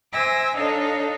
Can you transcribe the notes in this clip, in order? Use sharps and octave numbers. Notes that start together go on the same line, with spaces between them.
C5 E5 G#5 D6 E6 A#6
D4 D#4 A4 C#5 D#5 F5